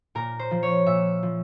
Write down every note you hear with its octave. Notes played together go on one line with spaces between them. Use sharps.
A#2 A#4
C5
F3
C#5
A#2 E5
F3